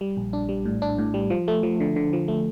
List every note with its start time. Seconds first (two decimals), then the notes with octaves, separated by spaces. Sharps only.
0.01 G3
0.17 A#1
0.33 D4
0.49 G3
0.65 A2
0.82 D4
0.98 A2
1.14 G3
1.30 F3
1.48 A3
1.63 F3
1.80 D3
1.96 D3
2.13 F3
2.28 A3